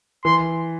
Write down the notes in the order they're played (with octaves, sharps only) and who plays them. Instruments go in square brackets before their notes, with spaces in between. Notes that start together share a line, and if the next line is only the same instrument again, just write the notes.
[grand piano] E3 [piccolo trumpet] C6